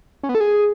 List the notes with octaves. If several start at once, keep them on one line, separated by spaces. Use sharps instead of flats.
C#4
B3
A4
G#4